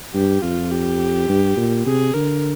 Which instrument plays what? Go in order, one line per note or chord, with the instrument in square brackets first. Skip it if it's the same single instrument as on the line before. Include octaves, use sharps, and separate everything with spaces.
[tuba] G2 [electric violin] G4
[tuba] F2 [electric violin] F4
[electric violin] G4
[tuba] G2
A#2
[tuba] C3 [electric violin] G#4
[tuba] D3 [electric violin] A#4